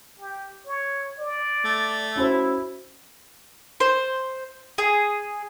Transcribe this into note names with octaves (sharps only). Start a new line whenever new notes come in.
G4
C#5
D5
A3
C#4 E4 F#4 C5
C5
G#4